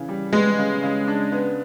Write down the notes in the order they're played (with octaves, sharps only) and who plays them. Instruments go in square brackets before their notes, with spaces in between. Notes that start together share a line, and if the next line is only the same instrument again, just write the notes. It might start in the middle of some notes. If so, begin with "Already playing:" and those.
Already playing: [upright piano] C#3 E3
G3
[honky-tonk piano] G#3 [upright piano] B3
[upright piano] C#3
C#3
D4
B3